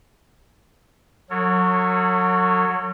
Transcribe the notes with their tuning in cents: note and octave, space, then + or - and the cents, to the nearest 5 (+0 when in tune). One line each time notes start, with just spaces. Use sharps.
F#3 -20 A4 +45 C#5 +0